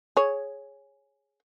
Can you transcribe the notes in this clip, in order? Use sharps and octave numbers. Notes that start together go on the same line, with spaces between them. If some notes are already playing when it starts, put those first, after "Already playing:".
G#4 C#5